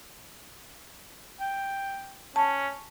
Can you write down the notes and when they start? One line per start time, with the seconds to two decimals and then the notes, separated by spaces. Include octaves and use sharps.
1.41 G5
2.36 C#4 A5